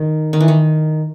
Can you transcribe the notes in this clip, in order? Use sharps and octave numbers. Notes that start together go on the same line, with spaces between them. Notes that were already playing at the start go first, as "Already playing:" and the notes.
Already playing: D#3
D#3
E3
D#3